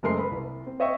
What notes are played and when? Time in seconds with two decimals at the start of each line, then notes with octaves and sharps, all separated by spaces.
0.03 F#1 G#3 A3 A#4 C6 C7
0.19 B4 B5
0.31 C2
0.66 C4
0.80 C#5 D#5 E5 G5 C#6